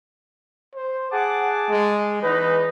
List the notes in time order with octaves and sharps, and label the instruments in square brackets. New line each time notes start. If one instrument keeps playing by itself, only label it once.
[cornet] C5
[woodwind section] G#4 A5 D6 [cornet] F#5
[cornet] G#3
[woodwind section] E2 E3 D#4 [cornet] B4